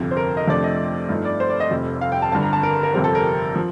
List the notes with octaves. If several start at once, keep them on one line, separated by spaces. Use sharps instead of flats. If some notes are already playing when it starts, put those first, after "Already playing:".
Already playing: G1 F2 C3
C5
A#4
D#5
F2 C3 F3 A3 D4 D5
D#5
G2 F3 A3 D#4
D5
C5
D5
D#5
F1 F2 C3
F5
G5
A5
G1 G2 D3 A5
A#5
A5
A#4
A#4
G1 F2 C3 G3 C4 A#4
A4
A#4
F3